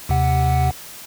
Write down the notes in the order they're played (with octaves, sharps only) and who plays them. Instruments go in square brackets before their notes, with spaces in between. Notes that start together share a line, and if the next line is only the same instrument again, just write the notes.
[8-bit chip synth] D#2 C3 F#5